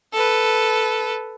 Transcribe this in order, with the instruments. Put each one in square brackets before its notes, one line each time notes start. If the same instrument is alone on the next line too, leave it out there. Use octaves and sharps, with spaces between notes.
[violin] A4 B4